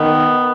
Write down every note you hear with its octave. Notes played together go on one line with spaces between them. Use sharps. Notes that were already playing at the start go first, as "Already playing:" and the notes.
Already playing: D#3 B3